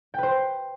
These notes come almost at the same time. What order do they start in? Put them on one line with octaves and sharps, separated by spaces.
G5 B4 C5